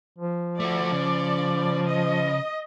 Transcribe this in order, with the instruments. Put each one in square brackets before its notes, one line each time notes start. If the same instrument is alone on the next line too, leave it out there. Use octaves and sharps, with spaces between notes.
[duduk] F3
[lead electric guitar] A3 F#4 [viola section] D5
[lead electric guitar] C#3
[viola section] D#5